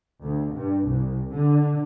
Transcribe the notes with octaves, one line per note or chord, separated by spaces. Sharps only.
D2
G2
C2
D3